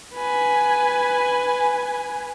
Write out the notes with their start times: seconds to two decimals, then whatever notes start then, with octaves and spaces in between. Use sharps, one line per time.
0.14 B4 G#5